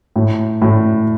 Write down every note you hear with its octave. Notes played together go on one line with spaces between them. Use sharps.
A2
A2